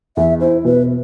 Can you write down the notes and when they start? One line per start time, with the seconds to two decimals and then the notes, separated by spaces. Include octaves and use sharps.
0.17 E2 E5
0.40 E4 C5
0.65 B2 B4